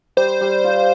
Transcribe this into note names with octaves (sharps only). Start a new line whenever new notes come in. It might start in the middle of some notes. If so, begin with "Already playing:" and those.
G3 C5
G3
F4